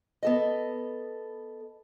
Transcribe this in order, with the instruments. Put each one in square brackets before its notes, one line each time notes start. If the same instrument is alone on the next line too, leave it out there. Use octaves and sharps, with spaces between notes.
[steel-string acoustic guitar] B3 A4 D#5